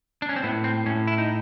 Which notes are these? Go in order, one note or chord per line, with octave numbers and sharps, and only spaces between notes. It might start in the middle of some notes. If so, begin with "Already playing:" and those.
D4
C#4
C4
A2 B3
C4
A2 C#4
E4
D#4